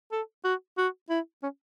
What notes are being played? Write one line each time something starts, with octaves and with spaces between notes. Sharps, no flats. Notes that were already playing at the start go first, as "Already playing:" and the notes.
A4
F#4
F#4
E4
C#4